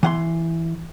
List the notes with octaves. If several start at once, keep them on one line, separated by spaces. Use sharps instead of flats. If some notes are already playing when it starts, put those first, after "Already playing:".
E3 F#5 C6